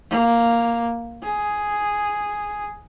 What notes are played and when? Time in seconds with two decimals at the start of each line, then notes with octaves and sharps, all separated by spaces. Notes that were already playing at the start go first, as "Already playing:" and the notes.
0.10 A#3
1.23 G#4